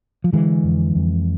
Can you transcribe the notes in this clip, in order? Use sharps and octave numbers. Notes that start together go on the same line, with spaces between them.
F3
D3 E3 G#3
F2
F2